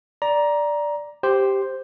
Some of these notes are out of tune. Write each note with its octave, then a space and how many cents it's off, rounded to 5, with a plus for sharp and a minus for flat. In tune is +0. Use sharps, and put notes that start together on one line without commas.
D5 +0 A#5 +15
G4 +0 C5 +0